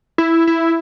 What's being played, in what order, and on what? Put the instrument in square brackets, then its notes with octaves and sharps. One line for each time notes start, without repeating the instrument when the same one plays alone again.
[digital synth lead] E4
E4